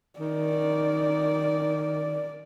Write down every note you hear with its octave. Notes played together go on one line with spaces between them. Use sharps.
D#3 D5